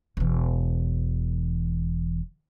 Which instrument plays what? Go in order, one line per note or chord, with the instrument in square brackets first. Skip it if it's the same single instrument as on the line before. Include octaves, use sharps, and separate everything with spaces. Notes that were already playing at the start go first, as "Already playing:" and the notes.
[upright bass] E1 E3